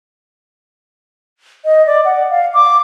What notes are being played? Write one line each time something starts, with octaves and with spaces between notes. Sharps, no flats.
D#5
D5
F#5
F5
D6